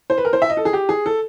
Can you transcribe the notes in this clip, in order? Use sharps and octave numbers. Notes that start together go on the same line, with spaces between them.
C5
B4
A#4
C5
E5
D#5
A4
G#4
G4
G#4
A4